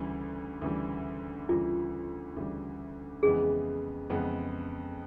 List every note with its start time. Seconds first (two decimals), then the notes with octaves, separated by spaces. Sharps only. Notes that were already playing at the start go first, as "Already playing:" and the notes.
Already playing: D2 C#3 E3 G3
0.62 D2 C#3 E3 G3
1.49 D2 C#3 E3 G3 F4
2.37 D2 C#3 E3 G3
3.23 F2 C#3 E3 G#3 B3 G#4
4.10 F2 C#3 E3 G#3 B3